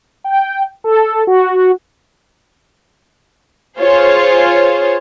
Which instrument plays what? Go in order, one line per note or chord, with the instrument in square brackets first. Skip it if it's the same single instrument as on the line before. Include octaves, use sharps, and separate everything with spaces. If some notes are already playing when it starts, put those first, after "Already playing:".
[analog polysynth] G5
A4
F#4
[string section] F4 G#4 C5 C#5